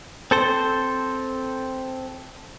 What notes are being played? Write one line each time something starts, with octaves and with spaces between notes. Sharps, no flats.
C4 A4 C5